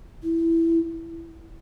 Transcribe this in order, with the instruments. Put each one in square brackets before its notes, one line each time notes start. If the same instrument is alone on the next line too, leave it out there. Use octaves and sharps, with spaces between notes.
[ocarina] E4